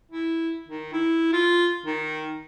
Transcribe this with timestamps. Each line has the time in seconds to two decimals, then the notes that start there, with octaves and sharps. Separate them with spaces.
0.11 E4
0.68 D#3
0.93 E4
1.33 F4
1.86 D#3